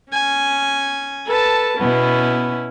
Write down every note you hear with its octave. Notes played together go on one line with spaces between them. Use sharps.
C#4 G#5
A4 B4 A5
B2 B3 C#4 E4